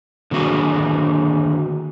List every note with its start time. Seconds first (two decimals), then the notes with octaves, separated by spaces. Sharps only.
0.31 D3 D#3 A#3 F#4 G#4